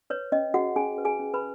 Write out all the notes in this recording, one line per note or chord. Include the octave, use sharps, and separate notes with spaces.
B4 C#5
C#4 D#5
F#4 G#4 F#5
C#4 G#4 G#5
B4
G#4 G#5
C#4
B4 B5